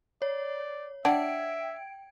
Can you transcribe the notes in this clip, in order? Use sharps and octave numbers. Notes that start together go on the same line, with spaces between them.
C#5 D5
D4 E5 F#5 G5 G#6 D7